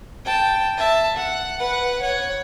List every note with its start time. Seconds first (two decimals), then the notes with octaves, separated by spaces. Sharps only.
0.25 G5 A5
0.77 E5 A5
1.16 F#5
1.59 B4 F#5
2.01 C#5 F#5